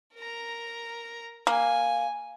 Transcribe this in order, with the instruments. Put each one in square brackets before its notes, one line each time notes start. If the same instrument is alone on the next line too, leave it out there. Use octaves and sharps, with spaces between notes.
[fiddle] A#4 A#5
[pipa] A#3 [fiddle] G#5